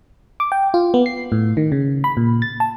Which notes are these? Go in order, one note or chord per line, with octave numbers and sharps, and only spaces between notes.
D6
G5
F4
B3
C7
A2
D#3
C#3
B5
A#2
A6
A5